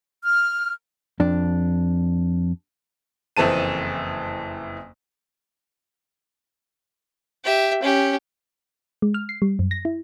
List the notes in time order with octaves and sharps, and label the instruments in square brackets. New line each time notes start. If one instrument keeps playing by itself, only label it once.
[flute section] F6
[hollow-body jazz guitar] F2 D4
[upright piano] F#1 F2 E3 C4 A5 D#7
[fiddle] G4 E5
C#4 G4
[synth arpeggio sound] G#3
F6
C7
G3
F#2
A#6
E4